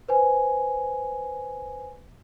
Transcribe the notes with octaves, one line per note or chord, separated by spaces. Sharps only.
B4 C5 G#5